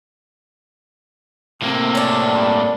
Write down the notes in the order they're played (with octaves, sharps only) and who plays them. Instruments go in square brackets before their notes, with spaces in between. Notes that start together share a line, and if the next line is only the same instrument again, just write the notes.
[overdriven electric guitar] A2 A#3 [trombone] C3 [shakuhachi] C4
[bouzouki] C#4 D4
[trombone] G2